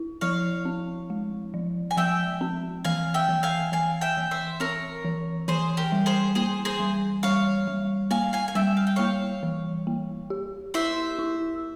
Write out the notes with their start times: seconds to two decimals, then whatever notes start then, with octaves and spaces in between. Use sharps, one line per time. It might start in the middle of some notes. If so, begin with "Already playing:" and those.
Already playing: E4
0.21 F3 C#5 F5
0.65 C4
1.10 G#3
1.54 F3
1.91 G#5
1.97 F3 E5 G5
2.41 C4
2.85 E3 F5 G#5
3.14 E5 G5
3.29 E3
3.43 F5 G#5
3.72 E3 F5 G#5
4.01 E5 G5
4.17 E3
4.31 C5 E5
4.60 C4 A#4 C#5
5.05 E3
5.48 E3 G#4 C5
5.77 G4 A#4
5.92 G3
6.06 G#4 C5
6.35 A#3 G#4 C5
6.65 G#4 C5
6.80 G3
7.23 G3 C#5 F5
7.67 G3
8.11 A#3 F5 G#5
8.33 F5 G#5
8.48 G#5
8.55 G3 E5 G5
8.77 F5
8.87 G5
8.96 A#3 C#5 F5
9.43 E3
9.87 A#3
10.30 G4
10.74 E4 C5 E5
11.19 E4